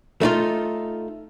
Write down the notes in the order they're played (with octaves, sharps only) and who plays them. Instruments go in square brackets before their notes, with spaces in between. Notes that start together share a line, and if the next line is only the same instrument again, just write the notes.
[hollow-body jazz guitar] A3 D#4 F4